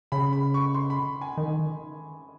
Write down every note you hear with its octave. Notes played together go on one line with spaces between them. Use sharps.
C#3 B5
B5
C#6
C6
B5
G#5
D#3